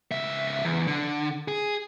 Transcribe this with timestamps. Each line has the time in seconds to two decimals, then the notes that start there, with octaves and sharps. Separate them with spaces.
0.11 C#2 E5
0.65 E2
0.87 D3
1.48 G#4